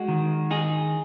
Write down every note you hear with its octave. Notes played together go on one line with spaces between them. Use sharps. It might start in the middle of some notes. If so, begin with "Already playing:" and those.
Already playing: G#3 F#4
D#3
D#4 G#4